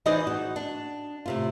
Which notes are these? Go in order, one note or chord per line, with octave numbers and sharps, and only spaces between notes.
E3 D#4 G#4 C5 D5 D#5
F#4
D4
A2 C3 F4